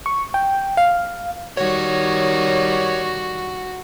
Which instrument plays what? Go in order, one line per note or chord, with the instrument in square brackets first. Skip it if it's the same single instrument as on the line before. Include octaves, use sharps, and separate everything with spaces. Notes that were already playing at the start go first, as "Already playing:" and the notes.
[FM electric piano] C#6
G5
F5
[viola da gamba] D#3 G3 [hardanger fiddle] F#4 [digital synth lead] C#5